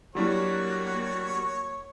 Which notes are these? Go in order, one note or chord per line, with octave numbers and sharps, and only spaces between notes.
F#3 G3 A#3 D4 E4 F#4 G4 C#5